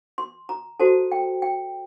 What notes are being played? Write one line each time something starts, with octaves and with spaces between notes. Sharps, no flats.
C6
A#5
F#4 A4 C5 A5
G5
G5